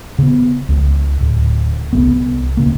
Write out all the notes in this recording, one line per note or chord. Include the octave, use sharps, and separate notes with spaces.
C#3 B3
C#2
D1
C2 F#2 B3
D#1 C#3 A#3